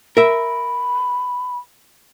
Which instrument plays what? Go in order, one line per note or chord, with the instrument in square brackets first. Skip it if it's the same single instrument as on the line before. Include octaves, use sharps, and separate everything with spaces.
[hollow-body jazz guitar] A#4 E5 [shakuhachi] B5